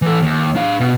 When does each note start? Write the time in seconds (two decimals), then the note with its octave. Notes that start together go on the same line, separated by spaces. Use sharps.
0.02 E3 A4
0.22 D#2
0.56 D4 F5
0.80 B2